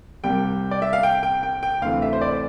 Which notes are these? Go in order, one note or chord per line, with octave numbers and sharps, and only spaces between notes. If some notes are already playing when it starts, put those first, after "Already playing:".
C2 C3 G3 A#3 G5
D5
E5
F5
G5
G5
G5
G5
D2 C3 E3 A3 F5
E5
C5
D5